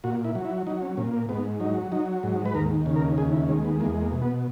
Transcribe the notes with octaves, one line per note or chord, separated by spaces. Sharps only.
A#2 F#4
E4
F#3
E4
F#3 D#4
C#4
A#2 C#4
A#3
G#2 B3
F#3 D#4
F#3 D#4
G#2
B4
D#2 A#4
C#3
A#4
D#2 G#4
E4
G#3 C#4
B3
E2 A#3
A#3
B2
B3